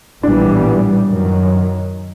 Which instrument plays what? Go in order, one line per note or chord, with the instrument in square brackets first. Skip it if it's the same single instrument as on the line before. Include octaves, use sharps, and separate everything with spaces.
[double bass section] A#1 A2 E3 G3 B3 [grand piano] D4
[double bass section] F#2 D#3 F#3